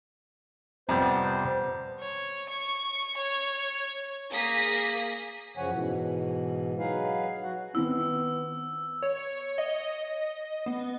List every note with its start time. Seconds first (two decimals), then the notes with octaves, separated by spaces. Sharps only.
0.89 F2 C3 G3 B3 C5
2.00 C#5
2.49 C#6
3.17 C#5
4.32 A#3 G#4 D#6 A#6 B6
5.57 F#2 C#3 F3 C#5 F#5 G#5
5.70 G#2 B2 E3
6.79 F#3 D#4 G#4 B4 F5
7.43 F#3 F#4 F#5
7.75 D#3 B3 C4 E4 E6
9.03 C#5
9.58 D#5
10.66 B3